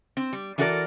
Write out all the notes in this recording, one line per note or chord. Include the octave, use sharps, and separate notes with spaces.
C4
G3
E3 D4 F#4 A4 A#4 D5